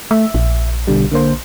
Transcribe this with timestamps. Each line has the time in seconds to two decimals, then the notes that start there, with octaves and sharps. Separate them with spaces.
0.11 A3 E5
0.34 A#1
0.87 B2 D3 G3
1.12 D3 A#3 C5